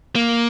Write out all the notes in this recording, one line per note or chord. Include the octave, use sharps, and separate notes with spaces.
A#3